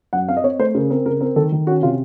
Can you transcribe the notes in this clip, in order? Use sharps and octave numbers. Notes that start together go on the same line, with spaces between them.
F#2 F#5
C4 F5
D#5
C4 C#5
A3 C5
C#3 A#4
C4 A#4
C#3 A#4
C4 A#4
D#3 A4
D#3
C#4 F#4
C3 F4